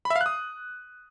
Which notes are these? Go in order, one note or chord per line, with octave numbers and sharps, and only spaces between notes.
B5
E5
F5
F#6
D#6